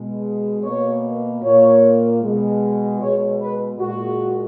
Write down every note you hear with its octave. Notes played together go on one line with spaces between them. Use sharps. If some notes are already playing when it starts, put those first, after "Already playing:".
Already playing: B2 G#3
B2 A#3 C#5
A#2 A#3 C#5
B2 G#3
B2 G#3 C#5
B4
A#2 G#3 F#4